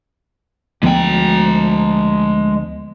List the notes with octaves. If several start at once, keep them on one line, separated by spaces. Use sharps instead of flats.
D2 F3 G#3 B3 G5